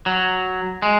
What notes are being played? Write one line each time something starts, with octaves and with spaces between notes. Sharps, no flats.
F#3
G#3